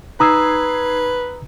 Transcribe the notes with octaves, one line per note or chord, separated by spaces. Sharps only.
D#4 B4 A#5 D#6 E6 G#6 C7